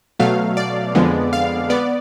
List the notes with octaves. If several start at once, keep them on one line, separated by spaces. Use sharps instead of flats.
B2 F#3 A3 F5
D5
F2 D3 G#3 B3
F5
B3 D5